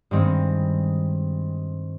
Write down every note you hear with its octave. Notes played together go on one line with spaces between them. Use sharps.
G2 D#3 G#3 C4 D#4